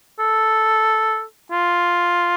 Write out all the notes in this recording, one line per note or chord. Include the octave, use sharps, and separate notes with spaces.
A4
F4